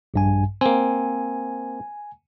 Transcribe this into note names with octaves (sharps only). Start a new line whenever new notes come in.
A#1 G2 G#5
A#3 C4 G#5